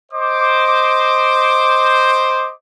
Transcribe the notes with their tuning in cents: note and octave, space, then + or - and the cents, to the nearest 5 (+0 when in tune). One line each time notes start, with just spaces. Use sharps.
C5 +0 D#5 +0 D6 +5